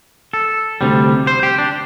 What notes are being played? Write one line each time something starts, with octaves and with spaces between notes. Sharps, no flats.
A4
D2 C3 G3
C5
G4
D4